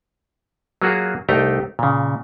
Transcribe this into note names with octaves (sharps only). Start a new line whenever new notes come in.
F#3 A#3 F4 F#4 G#4
C2 A3 D#4 G4 G5 A#5
A#2 C#3